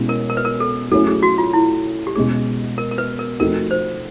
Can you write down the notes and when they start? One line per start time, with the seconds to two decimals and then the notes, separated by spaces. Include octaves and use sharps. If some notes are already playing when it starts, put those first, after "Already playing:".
Already playing: B2 G#3 C#4 E4
0.09 A#4
0.30 A#4
0.37 B4
0.45 A#4
0.60 A4
0.91 F#3 A3 C#4 E4 A4
1.07 G#4
1.23 F#4
1.38 F4
1.53 E4
2.07 G4
2.16 B2 G#3 C#4 G#4
2.78 A#4
2.91 A#4
2.98 B4
3.19 A#4
3.40 F3 A3 C4 D#4 F#4 A#4
3.71 C5